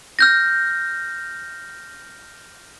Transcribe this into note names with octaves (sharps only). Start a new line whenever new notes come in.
F6 G6 A#6